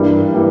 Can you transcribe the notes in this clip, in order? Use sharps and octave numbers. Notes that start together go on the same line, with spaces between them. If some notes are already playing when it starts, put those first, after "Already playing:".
Already playing: G2 E3 G3 A#3
E3 G3 A#3